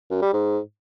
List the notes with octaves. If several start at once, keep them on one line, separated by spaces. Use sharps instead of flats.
F#2
G3
G#2